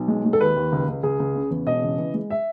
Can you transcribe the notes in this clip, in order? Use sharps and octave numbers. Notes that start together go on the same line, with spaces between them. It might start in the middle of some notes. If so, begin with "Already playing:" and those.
Already playing: B1
G#3
G#3
A4
D#2 B4
D#2
C#2
C#2
C#2 G#4
C#2
C#3
E2
E1 D#5
C#3
E3
G#3
E5